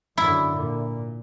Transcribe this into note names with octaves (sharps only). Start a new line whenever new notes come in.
F#2 D3 E4
A#2